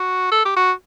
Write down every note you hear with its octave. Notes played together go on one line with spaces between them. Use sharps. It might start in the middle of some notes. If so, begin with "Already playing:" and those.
Already playing: F#4
A4
G4
F#4